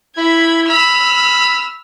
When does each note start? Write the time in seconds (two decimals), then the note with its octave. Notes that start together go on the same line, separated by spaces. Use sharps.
0.17 E4 B5 G#6
0.70 B5 E6 F6